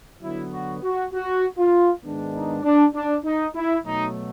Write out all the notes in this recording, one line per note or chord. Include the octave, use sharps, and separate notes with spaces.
D3 F#3 B3 E4
F#4
F#4
F#4
F4
G#2 D#3 G#3 B3 D4
D#4
D4
D4
D#4
E4
B2 F#3 A3 D#4